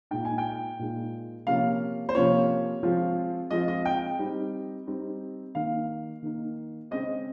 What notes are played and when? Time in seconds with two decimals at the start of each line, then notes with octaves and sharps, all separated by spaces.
0.11 A#2 G#3 D#4 G5
0.25 G#5
0.38 G5
0.79 A#2 G#3 D#4
1.47 C3 F3 A#3 C#4 F4 F5
2.09 C5
2.15 C3 F3 A#3 C#4 F4 C#5
2.83 F3 G#3 C4 F4
3.51 F3 G#3 C4 F4 D#5
3.68 D#5
3.85 G5
4.19 G3 C4 D#4
4.87 G3 C4 D#4
5.55 D#3 A#3 D#4 F5
6.22 D#3 A#3 D#4
6.91 C#3 G#3 C4 D#5